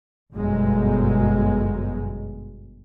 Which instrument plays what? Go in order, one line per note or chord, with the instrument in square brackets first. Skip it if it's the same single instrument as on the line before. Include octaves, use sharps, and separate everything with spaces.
[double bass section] G1 F#2 B2 G#3